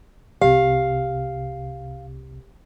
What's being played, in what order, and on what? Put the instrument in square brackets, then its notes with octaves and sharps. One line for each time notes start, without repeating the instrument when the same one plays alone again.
[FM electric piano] C2 C3 [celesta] G4 [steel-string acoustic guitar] F5